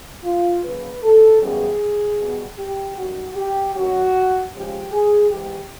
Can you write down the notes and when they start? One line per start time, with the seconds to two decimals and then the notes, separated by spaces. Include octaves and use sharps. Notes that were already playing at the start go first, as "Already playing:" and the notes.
0.24 F4
0.64 C#3 F#3 A#3 B4
1.03 A4
1.41 F#2 C#3 E3 G3 B3 G#4
2.19 B2 G3 B3
2.59 G4
2.97 F#2 D#3 G3 F#4
3.36 G4
3.75 F#2 D#3 F#3 F#4
4.54 C#3 F3 G#3 G4
4.92 G#4
5.31 G#2 E3 G#3 G4